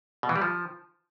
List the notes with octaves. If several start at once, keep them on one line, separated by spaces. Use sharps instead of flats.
B2
E3
G3
F3